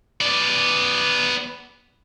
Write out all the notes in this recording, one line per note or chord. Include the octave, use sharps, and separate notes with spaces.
B3 D5